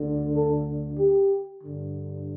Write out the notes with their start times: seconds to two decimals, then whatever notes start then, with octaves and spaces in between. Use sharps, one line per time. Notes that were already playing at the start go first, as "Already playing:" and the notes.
Already playing: D2 D3
0.34 A4
0.98 G4
1.61 G2 D3